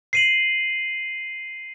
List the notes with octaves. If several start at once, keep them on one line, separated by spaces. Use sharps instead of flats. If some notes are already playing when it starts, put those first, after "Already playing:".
C7 D#7 F#7